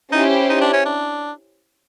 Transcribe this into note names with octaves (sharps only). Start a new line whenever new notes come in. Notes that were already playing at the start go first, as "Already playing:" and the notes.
C#4 D#4 E4 G4 C5
D#4
D4
C#4
D4